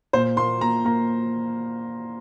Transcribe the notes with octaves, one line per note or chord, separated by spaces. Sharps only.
A#2 C5
A#3 C6
A#2 A#5
A#3 A#5